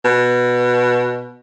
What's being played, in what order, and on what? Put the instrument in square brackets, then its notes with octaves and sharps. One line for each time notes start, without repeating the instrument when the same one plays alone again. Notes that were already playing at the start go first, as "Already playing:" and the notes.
[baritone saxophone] B2